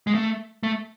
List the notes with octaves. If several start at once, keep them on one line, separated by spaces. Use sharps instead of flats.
G#3
A3
A3